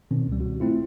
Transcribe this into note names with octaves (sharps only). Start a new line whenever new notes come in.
B2 D#3 C4 C#4
C#2 G3
F#4
A3 C4 E4 F4